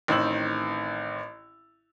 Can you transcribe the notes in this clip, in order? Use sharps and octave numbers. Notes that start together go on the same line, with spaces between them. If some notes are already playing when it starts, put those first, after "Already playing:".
A1 D#3 C4 E6 F#7